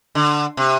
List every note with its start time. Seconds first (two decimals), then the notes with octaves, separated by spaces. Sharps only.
0.15 D3
0.57 C3